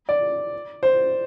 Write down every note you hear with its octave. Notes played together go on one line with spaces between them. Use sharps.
D5
C5